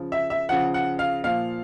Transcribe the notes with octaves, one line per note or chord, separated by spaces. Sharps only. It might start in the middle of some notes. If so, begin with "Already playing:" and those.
Already playing: C#3 F3
E5
E5
C#3 F3 F#5
F#5
F5
A#2 F3 F5